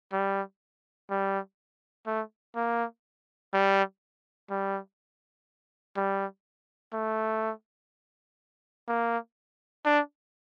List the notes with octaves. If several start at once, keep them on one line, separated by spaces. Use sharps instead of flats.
G3
G3
A3
A#3
G3
G3
G3
A3
A#3
D4